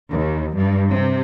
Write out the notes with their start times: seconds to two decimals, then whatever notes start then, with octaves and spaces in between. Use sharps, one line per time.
0.11 D#2
0.56 G2
0.89 C3